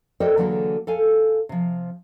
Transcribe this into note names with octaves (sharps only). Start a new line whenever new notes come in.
A4 A#4 C5 D5 D#5 G5
D3 E3 F#3 A#3 G#4 A4
A4 F5 G#5
C3 F3